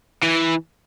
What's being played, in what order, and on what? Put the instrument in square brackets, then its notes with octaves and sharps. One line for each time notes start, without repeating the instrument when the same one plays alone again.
[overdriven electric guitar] E3